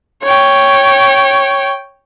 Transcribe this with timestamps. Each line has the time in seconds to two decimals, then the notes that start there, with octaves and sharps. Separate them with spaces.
0.23 C#5 G5